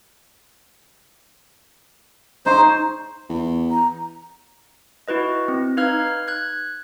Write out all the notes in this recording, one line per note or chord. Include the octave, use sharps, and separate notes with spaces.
D#4 C5 C#6
E2
A#5
E4 F#4 B4 D#5
C4
D#4 B4 F5 F6 G#6
F#6 G#6